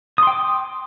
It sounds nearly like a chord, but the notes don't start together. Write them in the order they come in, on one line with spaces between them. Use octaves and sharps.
D#6 C6 G5 D6